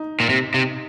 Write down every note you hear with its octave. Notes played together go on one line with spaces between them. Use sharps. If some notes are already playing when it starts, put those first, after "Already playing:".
Already playing: D#4
A#2
C3
C3